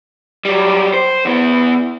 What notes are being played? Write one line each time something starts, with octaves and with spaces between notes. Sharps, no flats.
F#3 G3
C5
E2 B3